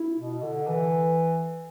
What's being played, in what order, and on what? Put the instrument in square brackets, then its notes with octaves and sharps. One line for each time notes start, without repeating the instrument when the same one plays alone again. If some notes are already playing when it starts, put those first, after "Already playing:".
Already playing: [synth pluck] E4
[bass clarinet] B2
D3
E3